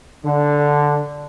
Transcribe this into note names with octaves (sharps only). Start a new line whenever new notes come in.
D3